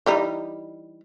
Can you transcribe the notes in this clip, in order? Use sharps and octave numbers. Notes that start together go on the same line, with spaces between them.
E3 G3 D#4